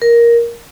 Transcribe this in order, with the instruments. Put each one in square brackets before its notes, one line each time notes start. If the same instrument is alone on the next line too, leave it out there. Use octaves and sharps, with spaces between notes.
[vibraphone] A#4